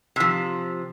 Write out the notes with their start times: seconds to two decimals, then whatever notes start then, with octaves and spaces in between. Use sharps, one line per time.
0.16 C3 F3